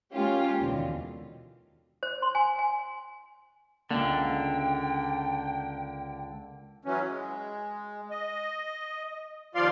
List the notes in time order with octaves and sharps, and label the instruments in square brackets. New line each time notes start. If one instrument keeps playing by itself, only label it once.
[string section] G#3 A#3 C#4 F4 G4
D#2 B2 D3 E3
[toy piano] C5
C6
G#5
G#5
[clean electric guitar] C#2 D3 [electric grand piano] A#3 [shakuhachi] G5
[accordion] E3 F#3 C#4
G#3
D#5
D#2 F3 F4 D5 F5 C6